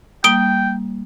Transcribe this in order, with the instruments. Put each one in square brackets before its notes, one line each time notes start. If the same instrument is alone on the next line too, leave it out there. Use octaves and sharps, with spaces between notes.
[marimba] G3 A#3 [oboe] G5 [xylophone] D#6 D7 G7